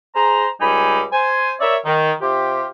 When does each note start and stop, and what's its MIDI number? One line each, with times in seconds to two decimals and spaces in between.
0.15 0.47 68
0.15 0.47 72
0.15 0.47 82
0.61 1.03 37
0.61 1.03 55
0.61 1.03 63
0.61 1.03 80
0.61 1.03 83
1.12 1.52 72
1.12 1.52 80
1.60 1.76 70
1.60 1.76 73
1.60 1.76 74
1.60 1.76 76
1.85 2.12 51
2.21 2.65 48
2.21 2.65 65
2.21 2.65 67